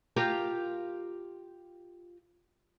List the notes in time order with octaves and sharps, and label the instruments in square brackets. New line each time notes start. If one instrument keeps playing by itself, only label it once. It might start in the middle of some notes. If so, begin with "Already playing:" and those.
[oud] F4 G4 A#4